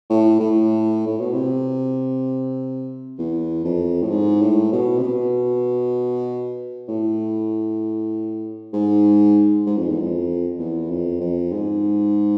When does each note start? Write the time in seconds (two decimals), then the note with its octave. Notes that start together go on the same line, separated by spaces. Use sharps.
0.10 A2
0.40 A2
1.07 A2
1.20 B2
1.33 C3
3.19 E2
3.64 F2
4.02 A2
4.10 G#2
4.41 A2
4.73 B2
4.99 C3
5.03 B2
6.88 A2
8.73 G#2
9.67 G#2
9.77 F2
9.90 E2
10.01 F2
10.59 E2
10.90 F2
11.21 F2
11.52 G#2